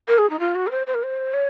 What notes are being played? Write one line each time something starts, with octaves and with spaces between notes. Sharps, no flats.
A#4
G#4
D#4
F4
F#4
A#4
C5
C5
A#4
C5
C#5